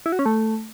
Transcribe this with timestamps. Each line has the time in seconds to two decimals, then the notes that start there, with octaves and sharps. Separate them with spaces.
0.06 E4
0.12 F#4
0.19 C#4
0.26 A3